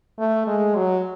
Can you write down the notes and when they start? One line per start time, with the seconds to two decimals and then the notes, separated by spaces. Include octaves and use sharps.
0.19 A3
0.47 G#3
0.76 F#3